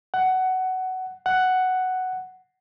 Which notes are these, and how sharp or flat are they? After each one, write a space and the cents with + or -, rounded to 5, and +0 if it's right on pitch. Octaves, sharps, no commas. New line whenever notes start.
F#5 +15
F#5 +5